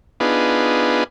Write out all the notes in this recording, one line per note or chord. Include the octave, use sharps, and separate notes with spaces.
B3 D4 D#4 F4 G#4 B4